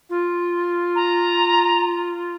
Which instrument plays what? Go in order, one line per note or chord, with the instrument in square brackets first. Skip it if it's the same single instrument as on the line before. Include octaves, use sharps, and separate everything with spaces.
[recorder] F4
[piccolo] A#5